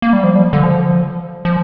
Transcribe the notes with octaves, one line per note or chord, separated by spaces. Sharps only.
A#3
G3
F3
G3
D3
F3
F3